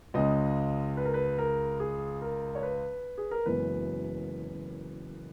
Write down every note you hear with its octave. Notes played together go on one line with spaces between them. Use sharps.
C#2 C#3 G#3 D#5
B4
A#4
B4
A#4
G#4
A#4
C#5
B4
G#4
A#4
F#1 F#2 E3 G#3 B3 B4